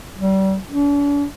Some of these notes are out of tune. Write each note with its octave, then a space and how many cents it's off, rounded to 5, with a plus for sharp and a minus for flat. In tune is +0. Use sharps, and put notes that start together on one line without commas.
G3 -30
D4 -45